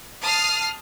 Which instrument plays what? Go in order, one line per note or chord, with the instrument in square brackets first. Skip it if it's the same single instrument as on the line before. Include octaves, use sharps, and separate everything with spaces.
[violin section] A5 D#6 F6 C7